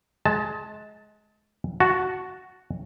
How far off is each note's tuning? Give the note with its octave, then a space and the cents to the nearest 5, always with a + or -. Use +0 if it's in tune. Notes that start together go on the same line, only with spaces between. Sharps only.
G#3 +25 A5 +0
F#4 +0 A5 +0